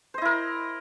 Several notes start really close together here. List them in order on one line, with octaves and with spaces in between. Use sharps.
C5 D#5 E4 A#4